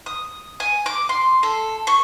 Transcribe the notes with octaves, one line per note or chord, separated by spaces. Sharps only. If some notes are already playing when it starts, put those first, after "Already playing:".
D#6
G#5
D6
C6
A4
C#6